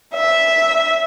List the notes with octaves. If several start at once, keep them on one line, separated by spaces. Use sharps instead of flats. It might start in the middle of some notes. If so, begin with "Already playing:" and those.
E5